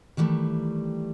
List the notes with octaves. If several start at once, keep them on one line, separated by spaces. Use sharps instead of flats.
D#3 E3 G3 A3